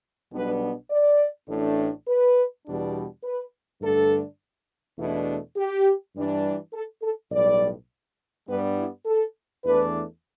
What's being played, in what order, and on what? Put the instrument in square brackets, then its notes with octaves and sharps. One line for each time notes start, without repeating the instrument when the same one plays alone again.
[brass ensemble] B1 B2 G3 B3 D4 B4
D5
A1 A2 A3 D4
B4
E2 B2 G3 D4
B4
G2 D3 A3 D4 A4
E2 B2 A3 D4 E4
G4
G2 E3 G3 D4
A4
A4
B1 A2 G3 D5
G2 G3 B3 D4 B4
E4
A4
E2 E3 A3 D4 B4